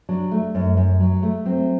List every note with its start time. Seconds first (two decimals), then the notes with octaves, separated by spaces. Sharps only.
0.09 F#3 D4
0.31 A3
0.55 F#2
0.77 F#2
1.00 F#3
1.23 A3
1.45 F#3 C4